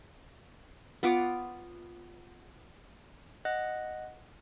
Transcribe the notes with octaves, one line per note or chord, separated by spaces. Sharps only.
B3 F4 D6
D#5 F#5 F#6 A#6